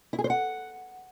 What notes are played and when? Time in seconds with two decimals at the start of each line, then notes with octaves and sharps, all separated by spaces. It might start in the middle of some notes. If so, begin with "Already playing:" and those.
0.13 E4
0.19 G#4
0.24 C5
0.30 F#5